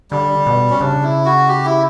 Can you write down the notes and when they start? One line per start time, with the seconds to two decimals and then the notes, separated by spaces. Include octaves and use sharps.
0.11 D3 G3
0.46 B2
0.70 C#4
0.81 C#3 D4
1.03 E4
1.25 F#4
1.48 G4
1.65 E4